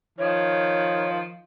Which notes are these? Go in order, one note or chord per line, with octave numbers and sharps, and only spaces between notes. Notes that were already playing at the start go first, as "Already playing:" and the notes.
D#3 F3 C#5